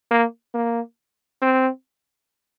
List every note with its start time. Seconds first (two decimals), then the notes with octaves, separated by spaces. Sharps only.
0.11 A#3
0.54 A#3
1.42 C4